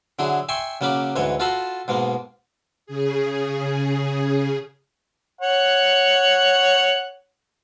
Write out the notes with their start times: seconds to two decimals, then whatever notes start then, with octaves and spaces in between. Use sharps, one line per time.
0.19 D3 F#3 E4 G#4
0.49 E5 G5 G#5 C6 C#6
0.81 C#3 F#3 A#3 C#4 B5 D6
1.16 D2 G#2 E3 C#5
1.40 F4 F#4 A4 A5 B5 C6
1.88 G#2 B2 G#3 A#3
2.86 C#3 G#4
5.41 C#5 F#5